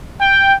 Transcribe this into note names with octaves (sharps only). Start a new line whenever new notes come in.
G5